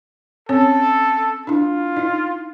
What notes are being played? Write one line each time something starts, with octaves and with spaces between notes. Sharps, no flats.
C4 C#4 A4 C#5
D4 E4 F4
D#4 E4